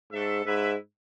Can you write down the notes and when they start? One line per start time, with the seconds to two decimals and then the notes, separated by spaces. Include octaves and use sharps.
0.12 G#2 A3 D4 A4 E5
0.45 G#2 E4 B4 E5